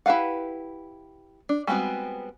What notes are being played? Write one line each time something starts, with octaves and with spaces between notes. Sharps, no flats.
E4 G4 B4 F5 F#5
D4
G3 G#3 B3 C4 F#4